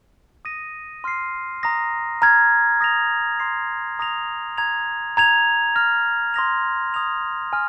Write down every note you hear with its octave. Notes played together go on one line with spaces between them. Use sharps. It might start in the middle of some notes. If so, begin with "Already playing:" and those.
D#6 A#6 D#7
C6 F6 C7
A#5 D#6 A#6
A#5 F6 G#6
D#6 A#6 F7
C6 D#6 C7
A#5 D#6 A#6 F7
A#5 G#6 F7
A#5 G#6 F7
F6 A#6 F7
C6 D#6 A#6 F7
D#6 G#6 F7
G#5 F6